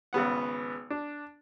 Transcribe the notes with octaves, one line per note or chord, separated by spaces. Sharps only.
G#1 C#3 B3 F#5
D4